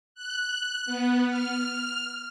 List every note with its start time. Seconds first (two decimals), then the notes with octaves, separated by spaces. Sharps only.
0.15 F#6
0.86 B3
1.29 F6